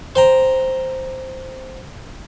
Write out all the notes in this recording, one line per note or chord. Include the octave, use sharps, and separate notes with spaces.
C5 G5 A#5